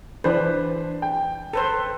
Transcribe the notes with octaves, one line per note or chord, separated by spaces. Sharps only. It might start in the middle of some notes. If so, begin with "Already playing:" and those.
E3 D4 B4 C5
G5
A4 B4 C5